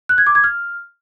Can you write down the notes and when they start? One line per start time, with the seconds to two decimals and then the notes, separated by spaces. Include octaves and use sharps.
0.09 F#6
0.18 G#6
0.27 D6
0.35 G#6
0.44 F6